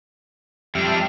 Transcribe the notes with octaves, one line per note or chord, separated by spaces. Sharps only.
F2 G3 D4 E5 F6